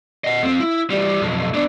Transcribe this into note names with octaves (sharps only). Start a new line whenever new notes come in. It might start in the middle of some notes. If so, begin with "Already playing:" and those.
D#5 F#5
F2 C4
E4
E3 G3
B1 F2
B3 D4